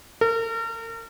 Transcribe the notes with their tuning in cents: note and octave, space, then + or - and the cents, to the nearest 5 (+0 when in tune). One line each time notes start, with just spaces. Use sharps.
A#4 -40